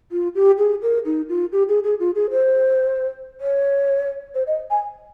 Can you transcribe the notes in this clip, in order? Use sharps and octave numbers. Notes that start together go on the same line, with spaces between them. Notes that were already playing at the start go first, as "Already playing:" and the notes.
F4
G4
G#4
A#4
D#4
F4
G4
G#4
G#4
F4
G#4
C5
C#5
C5
D#5
G#5